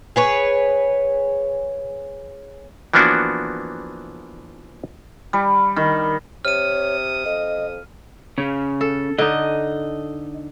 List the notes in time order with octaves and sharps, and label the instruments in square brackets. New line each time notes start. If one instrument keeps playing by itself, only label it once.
[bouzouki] G#4 B4 C#5
[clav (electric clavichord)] E3 F3 A#3 B3 D4 F#4
[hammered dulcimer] G3
D#3
[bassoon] C3 [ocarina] C#5 [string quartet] D#6 [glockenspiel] F6 D#7
[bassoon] F2 [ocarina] D#5
[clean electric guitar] C#3 C#4
[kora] A4
[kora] D3 D#4 [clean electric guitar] D#5